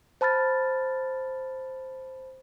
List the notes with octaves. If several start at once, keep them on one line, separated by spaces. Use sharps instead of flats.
C5 A5 B5 F6 A6